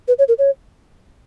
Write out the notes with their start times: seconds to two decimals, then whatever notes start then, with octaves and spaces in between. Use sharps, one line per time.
0.08 B4
0.19 C#5
0.28 A#4
0.38 C#5